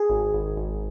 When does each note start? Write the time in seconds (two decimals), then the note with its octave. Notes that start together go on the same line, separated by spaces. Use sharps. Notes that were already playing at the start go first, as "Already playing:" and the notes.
Already playing: G#4
0.09 G#1
0.34 G#1
0.57 G#1